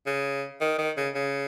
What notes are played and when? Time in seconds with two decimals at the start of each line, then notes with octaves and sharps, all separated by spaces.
0.07 C#3
0.61 D#3
0.78 D#3
0.97 C#3
1.15 C#3